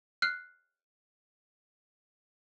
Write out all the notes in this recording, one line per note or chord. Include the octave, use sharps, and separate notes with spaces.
F6 F#6 C7